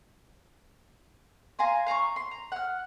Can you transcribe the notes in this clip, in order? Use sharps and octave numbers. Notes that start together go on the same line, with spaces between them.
F5 G#5 A#5 C6
F5 A#5 C6 C#6
C6
A#5
F#5 F6